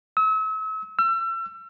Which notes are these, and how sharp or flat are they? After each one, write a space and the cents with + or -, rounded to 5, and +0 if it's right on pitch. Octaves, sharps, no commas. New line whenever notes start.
E6 -40
E6 +35